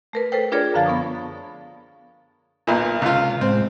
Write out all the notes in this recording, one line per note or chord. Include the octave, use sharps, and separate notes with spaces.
A3 A#4 B4
A4 B4 C5 G5
D4 F4 G#4 A#4 C#5 D5
F#2 D3 F3 F5 A5 A6
B3 C#6 D#6
B1 A#2
C#2 C3 F4
A2 G#3 C4